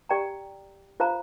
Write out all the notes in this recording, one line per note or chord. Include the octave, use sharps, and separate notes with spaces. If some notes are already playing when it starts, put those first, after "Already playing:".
G4 D5 G5 A#5
F4 C5 F5 A#5